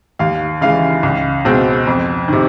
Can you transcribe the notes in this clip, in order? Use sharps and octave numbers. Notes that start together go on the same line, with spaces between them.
D#2 F5
C#3 E3 G#3 F5
C#2
B2 G#3 C4
F2
C3 D#3